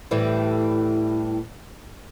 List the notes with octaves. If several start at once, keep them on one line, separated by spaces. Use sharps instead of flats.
A2 E3 G3